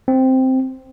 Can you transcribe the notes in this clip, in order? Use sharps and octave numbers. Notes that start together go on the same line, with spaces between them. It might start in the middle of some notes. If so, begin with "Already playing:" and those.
C4